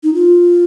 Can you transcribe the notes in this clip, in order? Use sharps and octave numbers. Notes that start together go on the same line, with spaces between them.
D#4
F4